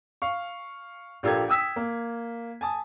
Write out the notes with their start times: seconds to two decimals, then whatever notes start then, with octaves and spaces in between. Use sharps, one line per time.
0.22 F5 C#6
1.23 A#1 F4 G4 A4 A#4 G#6
1.48 G5 D#6 E6 B6
1.76 A#3
2.61 G#5 A5 D#6